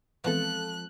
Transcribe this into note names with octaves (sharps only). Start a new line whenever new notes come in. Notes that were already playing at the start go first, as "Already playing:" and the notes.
E3 F3 G#3 B3 C4 A4 F#6